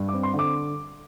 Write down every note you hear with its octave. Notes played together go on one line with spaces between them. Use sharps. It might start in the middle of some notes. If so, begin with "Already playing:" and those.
Already playing: G2
D6
C4
C6
D3
D6